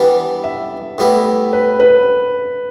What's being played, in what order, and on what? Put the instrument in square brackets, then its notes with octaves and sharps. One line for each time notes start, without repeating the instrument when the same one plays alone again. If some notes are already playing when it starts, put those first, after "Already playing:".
Already playing: [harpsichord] E3 G3 B3 D4
[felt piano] E5
[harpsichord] A2 G3 B3 E4
[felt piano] B4
B4